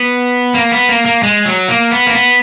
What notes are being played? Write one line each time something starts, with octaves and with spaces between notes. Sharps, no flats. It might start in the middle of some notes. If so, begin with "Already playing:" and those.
Already playing: B3
A#3
B3
A#3
A#3
G#3
F#3
A#3
B3
A#3
B3